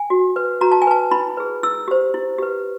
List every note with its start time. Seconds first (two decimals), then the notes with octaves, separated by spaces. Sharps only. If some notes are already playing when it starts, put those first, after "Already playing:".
Already playing: G#5
0.10 F#4
0.36 B4
0.61 F#4 A#5
0.72 A5
0.82 G#5
0.87 B4 A5
1.11 E4 B5
1.37 G#4 B4
1.63 E4 E6
1.88 G4 C5
2.14 E4
2.38 G4 B4